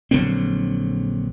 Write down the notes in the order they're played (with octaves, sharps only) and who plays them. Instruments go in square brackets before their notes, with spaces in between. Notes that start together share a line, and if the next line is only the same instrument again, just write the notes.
[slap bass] A#1 D3 F#3 C4